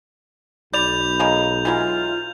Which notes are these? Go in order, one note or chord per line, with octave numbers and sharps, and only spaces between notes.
B1 D5 B5 G6 F7
G#3 A#3 C#4
E3 F#3 G#3 F4